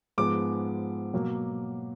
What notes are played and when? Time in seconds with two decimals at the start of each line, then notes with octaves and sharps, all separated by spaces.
0.18 G#2 F3 G#3 B3 D6
1.14 B2 F#3 A#3